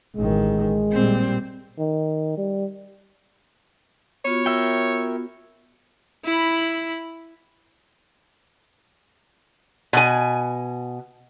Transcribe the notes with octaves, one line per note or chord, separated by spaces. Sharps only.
A1 D#3 G#3
A#2 G3 C4
D#3
G3
B3 F4 F#4 C#5
A#4 E5 G5
E4 B5
B2 G#5